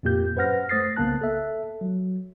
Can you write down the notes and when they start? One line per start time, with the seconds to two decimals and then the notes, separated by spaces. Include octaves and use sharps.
0.03 F2 A#2 A#3 G4 G6
0.36 F#2 B4 C5 F#5 F6 A#6
0.69 A3 C5 D#6 A6 A#6 C7
0.96 C2 C#3 A#3 B3 A5 F#6
1.21 A4 E5
1.81 F#3